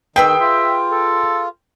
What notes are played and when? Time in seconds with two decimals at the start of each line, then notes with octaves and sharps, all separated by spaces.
0.16 D#3 G#4 B4 G5 E6
0.41 F4 E5
0.91 A4